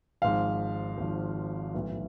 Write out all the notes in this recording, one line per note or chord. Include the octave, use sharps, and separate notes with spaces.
G#1 G#2 F3 F5
G#1 G#2 F3
B1 A2 E3